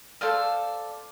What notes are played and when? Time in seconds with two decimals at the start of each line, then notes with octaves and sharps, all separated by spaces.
0.21 A4 C5 D5 F5